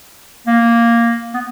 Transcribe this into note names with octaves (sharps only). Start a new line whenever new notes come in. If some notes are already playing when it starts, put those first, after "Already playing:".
A#3
B3